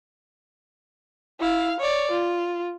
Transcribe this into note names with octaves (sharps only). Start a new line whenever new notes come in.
E4 F5
C#5 D5
F4